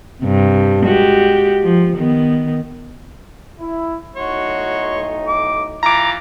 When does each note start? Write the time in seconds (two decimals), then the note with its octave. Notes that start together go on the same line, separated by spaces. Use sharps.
0.22 G2 C3
0.83 G#3 F#4 G4
1.62 F3
1.96 D#3 B3
3.60 E4
4.16 B1 A2 D#4 F#4 C#5 C6
5.28 D6
5.83 E3 F4 A#5 D6